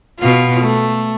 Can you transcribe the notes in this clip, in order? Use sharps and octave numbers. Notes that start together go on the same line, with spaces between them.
B2 F4
A3